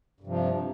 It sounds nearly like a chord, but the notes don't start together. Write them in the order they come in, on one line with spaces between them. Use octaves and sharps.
G2 C3 F3